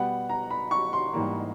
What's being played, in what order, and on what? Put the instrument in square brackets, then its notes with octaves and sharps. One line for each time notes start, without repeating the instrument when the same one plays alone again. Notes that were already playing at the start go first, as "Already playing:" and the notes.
Already playing: [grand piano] B2 G3 B3 [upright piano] F#5
[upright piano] A#5
B5
C#6
C6
[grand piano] G#2 E3 G3 A#3